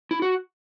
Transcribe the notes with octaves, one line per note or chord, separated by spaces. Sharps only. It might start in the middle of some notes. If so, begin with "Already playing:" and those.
E4
F#4